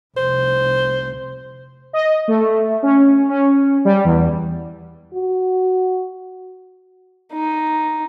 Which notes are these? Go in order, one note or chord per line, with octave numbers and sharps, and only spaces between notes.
F1 C2 C5
D#5
A3
C#4
C#4
G3
E2
F#4
D#4